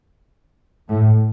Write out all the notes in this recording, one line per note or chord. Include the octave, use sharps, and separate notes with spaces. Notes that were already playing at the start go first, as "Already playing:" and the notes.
A2